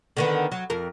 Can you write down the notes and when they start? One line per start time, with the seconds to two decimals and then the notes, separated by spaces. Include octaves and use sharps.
0.17 D3 D#3 B3
0.52 F#3
0.70 F2 A#4